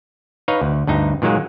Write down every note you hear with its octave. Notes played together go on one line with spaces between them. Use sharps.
D#4 B4 C#5 F5
D2
D2 G2 D#4
A#2 D#3 F#3 G#3 A#3